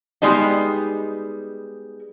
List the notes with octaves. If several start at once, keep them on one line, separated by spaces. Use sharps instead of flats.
G3 G#3 B3 D#4